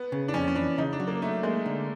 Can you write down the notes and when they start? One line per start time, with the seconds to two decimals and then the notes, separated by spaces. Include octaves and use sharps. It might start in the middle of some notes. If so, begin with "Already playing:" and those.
Already playing: B3
0.12 C#3
0.28 D4
0.34 F2 C#4
0.48 C#4
0.55 E3 D4
0.78 C#3 D#4
0.93 D4
1.00 F#3
1.07 A#3
1.22 A3 D#4
1.43 G#3 A#3
1.66 D3